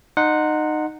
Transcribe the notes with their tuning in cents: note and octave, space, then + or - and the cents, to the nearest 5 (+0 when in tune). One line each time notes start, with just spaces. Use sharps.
D#4 -20 F#5 -10 C6 -5